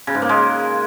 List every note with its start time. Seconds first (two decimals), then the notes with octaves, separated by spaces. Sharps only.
0.07 C#3
0.15 G#2
0.22 A#3
0.29 G#3